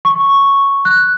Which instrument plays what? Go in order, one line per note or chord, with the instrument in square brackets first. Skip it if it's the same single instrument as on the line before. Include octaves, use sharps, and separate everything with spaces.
[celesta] C#6
F#6